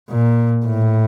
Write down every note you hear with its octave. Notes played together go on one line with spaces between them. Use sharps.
A#2
A2